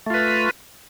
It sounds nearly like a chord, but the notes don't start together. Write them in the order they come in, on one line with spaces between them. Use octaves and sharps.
A3 F4 B4